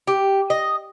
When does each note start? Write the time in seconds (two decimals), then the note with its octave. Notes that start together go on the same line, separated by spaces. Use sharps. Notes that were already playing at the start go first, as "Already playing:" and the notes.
0.07 G4
0.50 D#5